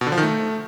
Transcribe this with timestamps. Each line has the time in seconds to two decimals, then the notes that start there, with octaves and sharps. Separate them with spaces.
0.01 B2
0.07 D3
0.12 F3
0.18 D#3
0.23 A3